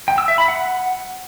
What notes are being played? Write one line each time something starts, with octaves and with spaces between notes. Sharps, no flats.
G5
E6
E5
B5
F#5